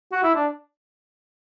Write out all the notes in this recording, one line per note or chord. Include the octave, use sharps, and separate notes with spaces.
F#4
E4
D4